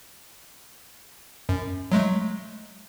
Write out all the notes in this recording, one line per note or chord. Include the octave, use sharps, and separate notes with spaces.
F#2
F#3 G#3 A3